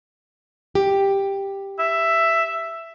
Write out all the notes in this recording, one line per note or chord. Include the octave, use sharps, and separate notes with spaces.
G4
E5